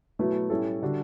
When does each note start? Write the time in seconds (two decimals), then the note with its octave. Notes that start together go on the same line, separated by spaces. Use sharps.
0.19 B2 F#3 A3 E4 B4
0.50 A2 G3 C#4 E4 A4
0.82 D3 G3 D4 F#4